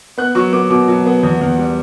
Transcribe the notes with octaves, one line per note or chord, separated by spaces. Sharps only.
B3 F#6
F#3 C#6
B3 D6
B2 D6
F#3
B3
E2
E2
G3